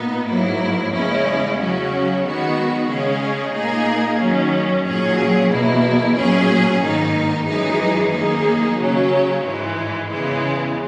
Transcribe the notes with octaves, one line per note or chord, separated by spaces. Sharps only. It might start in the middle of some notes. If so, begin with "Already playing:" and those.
Already playing: A#2 B3 D#4
G#2 F#3 A#3 E4
E2 C#3 G#3 C#4 E4
C#3 F#3 C#4 F#4
D#3 G#3 B3 F#4
C#3 G#3 C#4 G#4
A#2 A#3 D#4 G#4
F#2 D#3 F#3 C#4
A#2 F#3 C#4 G#4
E2 B2 A#3 E4
A#2 F#3 C#4 G#4
G#2 D#3 A#3 D#4
F#2 E3 G#3 D#4 G#4
F#2 D#3 A#3 D#4 G#4
C#3 F#3 C#4
G#2 E3 G#3
E2 C#3 E3 G#3